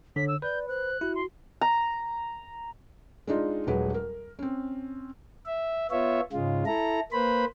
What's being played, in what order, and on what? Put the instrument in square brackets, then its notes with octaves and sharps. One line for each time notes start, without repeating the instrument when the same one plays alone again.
[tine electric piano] D3 [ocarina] C#5 [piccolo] B6
[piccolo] E6
[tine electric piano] B4 [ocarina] D5 [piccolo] G6
[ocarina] C5 [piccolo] F#6
[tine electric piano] E4 [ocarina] F#4
[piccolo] C6
[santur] A#5
[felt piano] G#3 D4 D#4 F4
D#1 F#3 G#3 B4
A#4
C4 C#4
[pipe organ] E5
B3 F4 C#5 E5
G#2 C#3 G#3 F4
E4 A4 A#5
A#3 B4 C5 B5